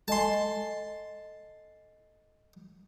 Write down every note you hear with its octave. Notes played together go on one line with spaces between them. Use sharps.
A4 D#5 G#5 A5 C6